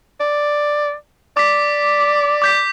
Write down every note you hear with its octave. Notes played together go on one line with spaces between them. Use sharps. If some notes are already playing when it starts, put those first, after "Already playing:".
D5
D5 D6 B6
D6 G6 B6